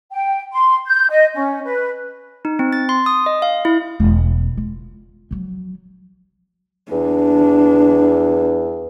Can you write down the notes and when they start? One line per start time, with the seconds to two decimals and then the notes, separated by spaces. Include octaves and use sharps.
0.12 G5
0.53 C6
0.86 G6
1.10 D#5
1.34 C#4
1.65 B4
2.45 D#4
2.59 C4
2.73 A6
2.89 C6
3.06 D#6
3.26 D#5
3.42 F5
3.65 E4
4.00 E1
4.57 F4
5.31 F3 F#3
6.92 E2 D4